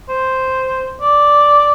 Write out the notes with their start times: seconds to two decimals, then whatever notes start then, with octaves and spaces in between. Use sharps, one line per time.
0.09 C5
1.01 D5